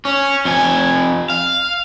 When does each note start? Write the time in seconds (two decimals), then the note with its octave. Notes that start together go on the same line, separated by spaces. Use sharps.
0.05 C#4
0.45 F2 G#5
1.30 F5